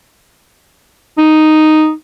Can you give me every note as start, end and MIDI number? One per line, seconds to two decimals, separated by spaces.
1.18 1.92 63